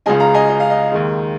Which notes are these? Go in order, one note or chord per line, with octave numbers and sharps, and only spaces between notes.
C#2 C#3 G#3 D#5 G#5
F5 A#5
D#5 G#5
D#5
F5
D#5
D#2 D#3 G#3